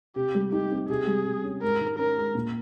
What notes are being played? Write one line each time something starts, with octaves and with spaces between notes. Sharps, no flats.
C3 G4
G3
D#4 G4
C4
C3 G#4
G3
C3
C#4
G#2 A#4
D#3
C#4 A#4
G#3
A#2